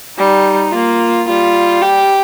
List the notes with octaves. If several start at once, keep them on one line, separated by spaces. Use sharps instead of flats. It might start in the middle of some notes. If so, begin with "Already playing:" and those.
G3 D#4
A#3 F4
G3 F4
G4